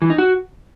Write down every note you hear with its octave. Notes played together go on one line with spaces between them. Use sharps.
E3
D#4
F#4